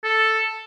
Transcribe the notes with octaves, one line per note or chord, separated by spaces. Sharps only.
A4